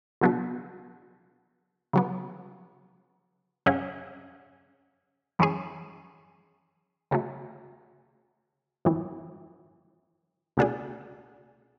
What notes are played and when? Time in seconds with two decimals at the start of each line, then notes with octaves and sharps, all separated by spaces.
0.21 C#2 B2 F#3 B3 D4
1.93 C#3 F#3 B3
3.66 F#2 C#3 F#3 C#4 G#4
5.39 F#2 E3 G#3 C#4 G#4
7.11 C#2 C#3 F#3 A3
8.85 G#1 F#2 E3
10.57 C#2 B2 A3 D4 G#4